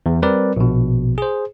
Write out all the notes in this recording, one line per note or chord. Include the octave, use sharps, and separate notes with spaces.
E2
G3 C4 A#4 B4 D5
A#1 B2
G#4 C5